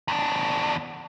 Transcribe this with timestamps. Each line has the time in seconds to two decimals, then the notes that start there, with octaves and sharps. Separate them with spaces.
0.08 E2 D4